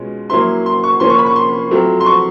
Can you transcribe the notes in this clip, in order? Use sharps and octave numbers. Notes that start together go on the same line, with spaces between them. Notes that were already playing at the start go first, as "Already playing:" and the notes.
Already playing: B2 G#3 C#4 F4
F#3 A#3 C#4 E4 C6
C6
C#6
F3 A#3 C#4 F4 C6
C#6
B5
C#6
C6
F#3 A3 C4 F4
C6
C#6